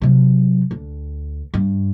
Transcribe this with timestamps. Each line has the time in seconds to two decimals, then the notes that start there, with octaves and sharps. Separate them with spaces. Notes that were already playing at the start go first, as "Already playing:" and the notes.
0.01 C3 F#3
0.71 D2
1.54 G2